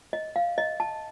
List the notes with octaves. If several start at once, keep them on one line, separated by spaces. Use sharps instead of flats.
D#5
F5
D#5
A5